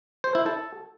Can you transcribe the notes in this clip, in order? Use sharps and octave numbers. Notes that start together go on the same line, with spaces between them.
C5
E4
A4